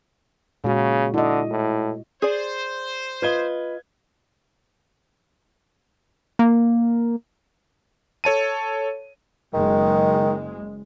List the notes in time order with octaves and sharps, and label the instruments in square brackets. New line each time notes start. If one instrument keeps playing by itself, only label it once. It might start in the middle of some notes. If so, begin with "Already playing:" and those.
[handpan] A#2 G#3 F#4 [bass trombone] C#3
[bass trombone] D3 [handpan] E4 D#5
[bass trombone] A2
[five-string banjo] G#4 D5 [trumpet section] C5
[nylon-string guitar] F4 D#5 [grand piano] B4 G#6 G7
[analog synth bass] A#3
[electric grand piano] A4 C#5 A5 D#7
[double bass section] F#1 G#3 [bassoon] D#3